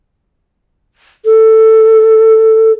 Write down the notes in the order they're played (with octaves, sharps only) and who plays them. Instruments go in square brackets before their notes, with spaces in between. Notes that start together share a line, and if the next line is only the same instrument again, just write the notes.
[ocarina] A4